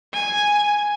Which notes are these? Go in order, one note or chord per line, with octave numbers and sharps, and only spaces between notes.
G#5